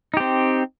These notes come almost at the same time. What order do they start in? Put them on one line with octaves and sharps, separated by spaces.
D#4 G4 C4